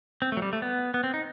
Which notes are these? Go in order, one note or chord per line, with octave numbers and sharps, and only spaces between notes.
C4
A3
F#3
G3
A3
B3
B3
C4
D#4